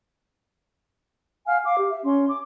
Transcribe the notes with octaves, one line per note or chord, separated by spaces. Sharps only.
F5 F#5 G#5 F6
F5 D6
G4
E5
C#4 C6
D6